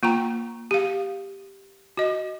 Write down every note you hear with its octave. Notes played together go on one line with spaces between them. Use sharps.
A#3 F4 G5 A#5
G4 F5
F#4 D#5